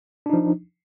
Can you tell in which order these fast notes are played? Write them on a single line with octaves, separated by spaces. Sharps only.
D4 D#4 F3